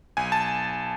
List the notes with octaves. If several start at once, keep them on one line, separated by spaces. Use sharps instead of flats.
B1 G#5
A5